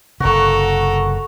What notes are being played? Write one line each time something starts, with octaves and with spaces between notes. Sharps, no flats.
F#1 C3 F#4 A4 A#4 C#6